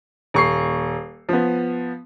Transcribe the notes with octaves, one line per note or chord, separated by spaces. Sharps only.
D#1 C#6 C7
F3 B3